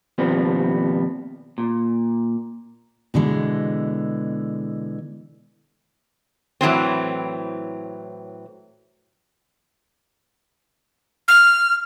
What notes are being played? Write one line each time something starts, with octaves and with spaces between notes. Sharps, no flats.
D#2 B2 F3 G3 B3 C4
A#2
B2 D3 E3 G#3
A2 E3 F#3 C4
F6